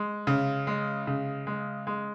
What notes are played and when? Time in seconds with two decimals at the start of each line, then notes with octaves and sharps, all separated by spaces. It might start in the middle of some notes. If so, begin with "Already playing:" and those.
Already playing: G#3
0.27 C#3
0.67 G#3
1.07 C#3
1.47 G#3
1.87 G#3